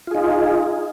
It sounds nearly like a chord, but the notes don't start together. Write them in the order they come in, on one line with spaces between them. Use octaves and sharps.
F4 G#4 D#4